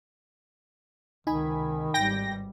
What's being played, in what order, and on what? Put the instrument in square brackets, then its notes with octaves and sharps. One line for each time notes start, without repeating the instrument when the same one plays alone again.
[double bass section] C#2 C3 [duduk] D#3 [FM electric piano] D#4 G#5 B5
[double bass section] G#1 G2 G3 [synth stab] G5 A#6